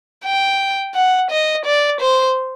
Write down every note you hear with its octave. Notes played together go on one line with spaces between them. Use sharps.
G5
F#5
D#5
D5
C5